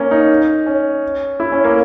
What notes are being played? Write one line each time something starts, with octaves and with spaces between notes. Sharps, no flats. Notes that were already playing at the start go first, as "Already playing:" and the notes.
Already playing: A#3 C#4
D#4
C#4
E4
C#4
A#3